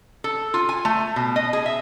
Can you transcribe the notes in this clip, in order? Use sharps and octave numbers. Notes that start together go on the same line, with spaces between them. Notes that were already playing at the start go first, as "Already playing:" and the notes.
A4
F4
G#5
A3
B2
D#5
G#4
E5